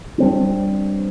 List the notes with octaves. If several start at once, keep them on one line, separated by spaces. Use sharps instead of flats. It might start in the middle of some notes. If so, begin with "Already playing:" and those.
G3 C4 D4